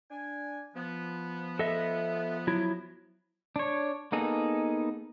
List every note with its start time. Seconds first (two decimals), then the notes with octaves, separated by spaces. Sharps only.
0.10 D4 G#5
0.75 F3 B3
1.59 A4 D#5 E5
2.47 F#3 E4
3.56 D4 C#5
4.12 A#3 B3 D#4 G#4 A4